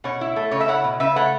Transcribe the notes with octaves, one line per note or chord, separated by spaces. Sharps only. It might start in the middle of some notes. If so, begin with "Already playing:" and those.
B2 C#5 F#5
E4
A3
C#3 C#5
E5
E4 C#5 F#5
B2
C#3 B4 E5
A3 C#5 F#5